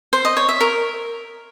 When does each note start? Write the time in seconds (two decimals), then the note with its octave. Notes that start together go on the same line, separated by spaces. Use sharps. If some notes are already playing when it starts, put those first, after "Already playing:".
0.13 C5
0.25 D#5
0.37 C#5
0.49 E5
0.61 A#4